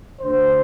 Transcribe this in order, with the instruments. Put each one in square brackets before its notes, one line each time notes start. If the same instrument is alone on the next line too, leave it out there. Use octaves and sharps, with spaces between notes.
[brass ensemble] D2 D3 C5